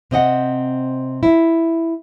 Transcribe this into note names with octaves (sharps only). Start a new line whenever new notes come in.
C3 C4 D#5 F#5
E4